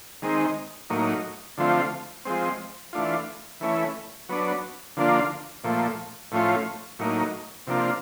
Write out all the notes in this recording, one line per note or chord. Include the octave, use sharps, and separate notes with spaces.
D#3 G#3 C4 D#4
A2 F#3 A#3 D#4
D3 F3 A3 C4 F4
F3 G#3 C4
E3 A3 D4 F4
E3 A3 C#4 E4
F#3 B3 D4
D3 F3 A#3 D4 F4
A#2 F3 A3
A2 F3 A3 C#4 F4
A2 F#3 A#3 D#4
C3 F3 A#3 D4 F4